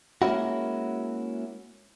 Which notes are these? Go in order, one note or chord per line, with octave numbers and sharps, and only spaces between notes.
G#3 A#3 C#4 E4 F#4